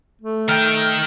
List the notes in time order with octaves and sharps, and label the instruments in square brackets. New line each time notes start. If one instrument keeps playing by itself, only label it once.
[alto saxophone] A3
[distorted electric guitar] D#3 G5 [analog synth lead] F6